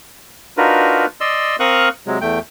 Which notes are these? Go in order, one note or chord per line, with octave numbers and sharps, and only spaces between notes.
D4 D#4 F4 F#4 A#4 B4
D5 D#5 C6 E6
C4 A#4 F5 C#6 D#6 F#6
C3 F#3 G#3
E2 A3 G5